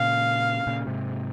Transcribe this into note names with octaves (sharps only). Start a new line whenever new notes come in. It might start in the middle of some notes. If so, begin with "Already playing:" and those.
Already playing: A#2 C#3 F5
A#2 C#3
G#2 C3